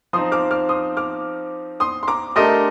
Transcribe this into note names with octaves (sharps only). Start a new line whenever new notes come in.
F3 C4 D#4 C6 D#6
D6 F6
D6 F6
C6 D#6
D6 F6
C6 D#6
C6
A#5 D6
A3 D4 G4 A#4 D#5 C6 D#6